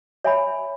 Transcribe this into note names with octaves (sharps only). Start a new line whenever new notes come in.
C#5 E5 G#5 B5